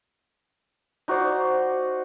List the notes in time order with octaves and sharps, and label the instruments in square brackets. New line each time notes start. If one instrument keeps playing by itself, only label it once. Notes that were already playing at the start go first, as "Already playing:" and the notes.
[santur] D#4 F#4 C5 D5